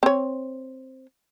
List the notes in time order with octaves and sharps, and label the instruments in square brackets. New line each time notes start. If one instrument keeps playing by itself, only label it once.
[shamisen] C4 C#5